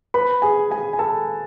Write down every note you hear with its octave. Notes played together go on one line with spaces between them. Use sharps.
B4 B5
G#4 G#5
G#4 G#5
G#5
A4 A5